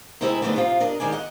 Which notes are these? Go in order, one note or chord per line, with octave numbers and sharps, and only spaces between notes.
C3 G#3 C4 E4 G#4 E5
D3 F3 G#3 A3 B3 D#4
C3 F3 F4
D4 A#4 D#5
D#3 G#3 D5 G#5
D#5 F#5